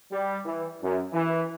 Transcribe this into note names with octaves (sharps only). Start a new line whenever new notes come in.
G3
E3
F#2
E3